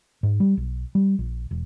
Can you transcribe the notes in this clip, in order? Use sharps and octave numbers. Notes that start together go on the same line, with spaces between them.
G#2
G3
B1
G3
A#1
E1